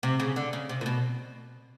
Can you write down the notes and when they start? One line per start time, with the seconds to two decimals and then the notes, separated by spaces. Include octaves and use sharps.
0.03 C3
0.20 C#3
0.36 D3
0.53 C#3
0.69 C3
0.81 A#2
0.86 B2